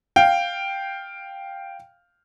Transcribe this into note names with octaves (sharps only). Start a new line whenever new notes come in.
F5 G5